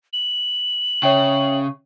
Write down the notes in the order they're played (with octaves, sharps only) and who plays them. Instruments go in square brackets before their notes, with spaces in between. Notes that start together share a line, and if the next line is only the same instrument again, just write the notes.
[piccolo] F#7
[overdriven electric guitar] C#3 [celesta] C#5 E5 G5